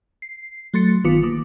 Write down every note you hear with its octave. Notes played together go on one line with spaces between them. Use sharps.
C7
F#3 A3 C6 A6 C#7
G1 D#3 B3 F4 D6 C#7
G#1 D#3 A#3 D6